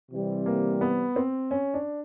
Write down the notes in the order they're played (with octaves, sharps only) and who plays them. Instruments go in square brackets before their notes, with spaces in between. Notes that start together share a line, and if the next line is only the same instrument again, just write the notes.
[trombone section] C3 E3 G3 C4
[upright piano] A#3
B3
C4
C#4
D4